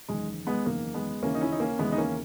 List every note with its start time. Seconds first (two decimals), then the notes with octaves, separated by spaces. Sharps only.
0.08 F#1 E2 D#3 G#3
0.47 G#3 B3
0.66 F#1 E2 D#3 A#3
0.94 G#3 B3
1.22 D#2 C#3 E3 A#3 C#4
1.35 D#4
1.41 C#4 E4
1.52 D#4
1.60 A#3 C#4
1.79 D#2 C#3 E3 G#3 B3
1.92 D#4
1.98 A#3 C#4